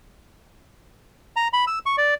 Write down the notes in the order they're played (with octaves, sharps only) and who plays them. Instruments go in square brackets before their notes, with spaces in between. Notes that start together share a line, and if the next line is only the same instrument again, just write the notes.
[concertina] A#5
B5
E6
C#6
D5